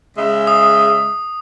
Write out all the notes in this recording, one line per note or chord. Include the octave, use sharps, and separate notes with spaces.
C#3 G#3 E5
D#6